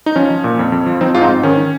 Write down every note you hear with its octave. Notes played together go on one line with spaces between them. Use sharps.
D#4
F3 C#4
F3
A#2
F2
F2
F3
F3 C4 D#4
G#2 F4
C4 D#4
G#2
D#3 C#4
D#3